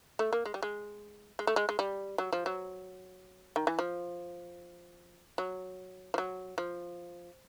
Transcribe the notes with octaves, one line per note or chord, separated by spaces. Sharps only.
A3
A#3
G#3
G3
G#3
G#3
A3
G#3
G#3
G3
F#3
F3
F#3
D#3
E3
F3
F#3
F3
F#3
F3